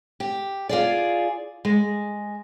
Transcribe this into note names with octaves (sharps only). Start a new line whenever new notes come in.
G4
F4 G#4 D5
G#3